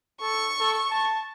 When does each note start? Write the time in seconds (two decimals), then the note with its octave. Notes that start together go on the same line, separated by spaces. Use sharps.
0.21 A4 C#6
0.60 A4
0.91 A5